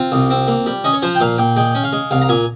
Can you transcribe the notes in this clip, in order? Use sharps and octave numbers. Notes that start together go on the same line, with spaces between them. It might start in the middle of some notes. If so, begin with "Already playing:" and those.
Already playing: C4 F4
C2
C4
A#3
G3
C#4 D#5
C#5
F3 C5
G5
A#2 F5
A#2 G5
G#3 G5
C#4
F5
G#3
C2 F5
A#5
A#2 G#5